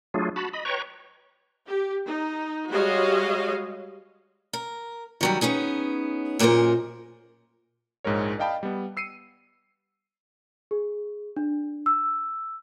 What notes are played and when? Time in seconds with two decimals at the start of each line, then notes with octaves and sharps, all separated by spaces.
0.14 F#3 A3 D4 F4 G#4
0.36 F#4 A5 B5
0.53 D#5 B5
0.65 B4 C#5 G5 A#5 C#6
1.66 G4
2.06 D#4
2.70 G3 G#3 F#4 C#5 D#5 F5
4.53 A#4
5.21 D#3 F#3 G3
5.41 B3 C#4 D#4 G#4
6.39 F#2 A#2 G#3 C4 A#4 C5
8.04 A#1 G#2 G#3 A#4 C#5
8.39 D5 D#5 F5 G5 A5 B5
8.63 G3 B3
8.97 E6 C7 C#7 D#7
10.71 G#4
11.37 D4
11.86 E6